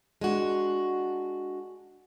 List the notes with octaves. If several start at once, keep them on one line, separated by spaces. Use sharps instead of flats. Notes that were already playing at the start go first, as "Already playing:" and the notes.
G#3 D4 F#4